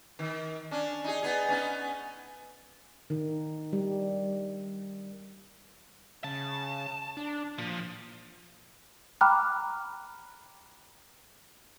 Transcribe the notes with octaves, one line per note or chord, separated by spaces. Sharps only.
D#3
C#4 D4
D#4 G#4
B3 D#4 G#4
B3 C#4 D#4
D#3
G3
C#3 A5
D4
A#2 F3
G5 A#5 B5 D6 F6 F#6